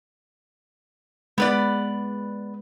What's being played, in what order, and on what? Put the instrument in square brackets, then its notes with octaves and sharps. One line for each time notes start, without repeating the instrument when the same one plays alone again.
[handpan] G#3 [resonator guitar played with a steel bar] B3 B4 D5